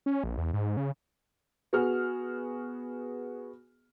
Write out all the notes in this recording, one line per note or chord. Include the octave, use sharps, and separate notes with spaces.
C#4
A#1
E2
G#2
C#3
B3 F#4 G#4 F6